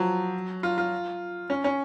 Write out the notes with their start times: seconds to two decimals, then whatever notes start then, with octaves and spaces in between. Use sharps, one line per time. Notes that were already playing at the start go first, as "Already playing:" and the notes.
Already playing: F3 F#3
0.63 F4
0.78 F4
1.50 C#4
1.64 C#4